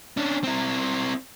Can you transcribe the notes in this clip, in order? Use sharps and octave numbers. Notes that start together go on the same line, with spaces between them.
C#4 D4
C4 E4